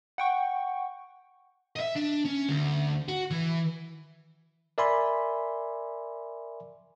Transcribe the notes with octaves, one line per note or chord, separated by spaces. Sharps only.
F#5 G5 C#6
D#5 E5
D4
C#4
D2
F#4
E3
A#4 D5 E5 G#5 B5 C6